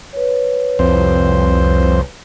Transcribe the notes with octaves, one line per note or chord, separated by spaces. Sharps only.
B4 C#5
C2 F2 C5